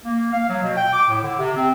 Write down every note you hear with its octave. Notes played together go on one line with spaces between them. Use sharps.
A#3
F5
F#3
B2
G5
D6
A2
D3
C3
C4